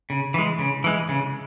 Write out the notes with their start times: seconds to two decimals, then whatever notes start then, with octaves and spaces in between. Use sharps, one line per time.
0.10 C#3
0.34 E3 G#3
0.59 C#3
0.84 E3 G#3
1.09 C#3